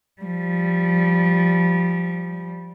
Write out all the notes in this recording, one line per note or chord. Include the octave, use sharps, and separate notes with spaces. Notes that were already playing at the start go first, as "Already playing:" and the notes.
F3 G3